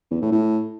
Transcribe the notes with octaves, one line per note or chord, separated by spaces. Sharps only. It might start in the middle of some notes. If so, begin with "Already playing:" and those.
E2
A2
A2